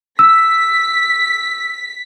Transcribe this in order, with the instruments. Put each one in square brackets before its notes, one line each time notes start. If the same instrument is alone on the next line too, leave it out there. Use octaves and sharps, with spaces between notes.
[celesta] E6 [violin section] B6